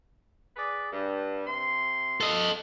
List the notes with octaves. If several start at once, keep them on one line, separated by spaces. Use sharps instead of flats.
G#4 B4 D5
G2
C3 C6
A4 D#5